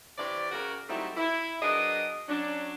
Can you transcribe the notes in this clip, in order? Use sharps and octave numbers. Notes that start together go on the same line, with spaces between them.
C3 E3 C#5 D5
C#3 F#4 A#4
F#3 G3 A3 C4 D#4 E4
E4
F#3 D4 G#4 A#4 B4 D#5
F#3 C#4 D4